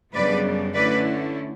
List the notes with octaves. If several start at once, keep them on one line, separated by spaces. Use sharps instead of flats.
F#2 C#3 G3 B3 D4 B4 D5
D3 A3 C#4 E4 B4 D5